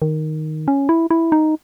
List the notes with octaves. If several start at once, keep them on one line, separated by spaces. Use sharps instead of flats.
D#3
C#4
E4
E4
D#4